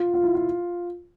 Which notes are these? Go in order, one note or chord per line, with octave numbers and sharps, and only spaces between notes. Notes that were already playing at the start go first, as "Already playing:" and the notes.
Already playing: F4
F4
E4
F4